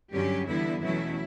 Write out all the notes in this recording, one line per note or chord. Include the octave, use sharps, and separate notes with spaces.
G2 D3 F#3 C#4 G4
E2 D3 G3 B3 E4
E2 B2 F#3 A3 C#4 E4